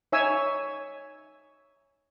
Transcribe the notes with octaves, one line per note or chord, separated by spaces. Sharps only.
D#4 C#5 E5 G#5 E6